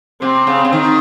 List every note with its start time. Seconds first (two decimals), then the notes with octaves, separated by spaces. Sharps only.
0.22 C3 C4
0.47 C#3
0.65 C#3
0.73 D#3